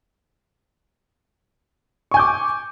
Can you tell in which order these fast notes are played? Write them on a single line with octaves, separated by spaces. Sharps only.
C#6 G#5 G6 D6